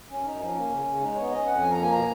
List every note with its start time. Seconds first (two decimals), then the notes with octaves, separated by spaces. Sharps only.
0.09 F#2 C#4
0.25 F#2 D#4
0.40 F3 C#4
0.55 A#3
0.71 C#3
0.86 C#3
1.00 G#3 D#4
1.16 B3 C#5
1.31 C#4 D#5
1.46 F2 F#5
1.62 F3 G#5
1.72 A#5
1.77 A#3
1.82 G#5
1.92 B2 A#5